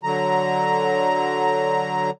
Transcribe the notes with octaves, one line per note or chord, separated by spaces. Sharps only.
D3 F#3 A#5